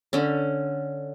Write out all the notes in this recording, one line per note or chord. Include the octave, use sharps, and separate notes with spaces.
D3 C#4